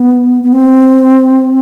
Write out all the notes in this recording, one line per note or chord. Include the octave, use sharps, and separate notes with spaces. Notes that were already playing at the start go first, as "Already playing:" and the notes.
Already playing: B3
B3
C4